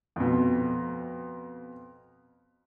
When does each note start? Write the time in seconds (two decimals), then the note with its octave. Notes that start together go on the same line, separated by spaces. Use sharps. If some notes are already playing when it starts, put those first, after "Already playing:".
0.16 F2 B2